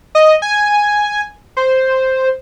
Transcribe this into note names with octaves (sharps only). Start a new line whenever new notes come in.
D#5
G#5
C5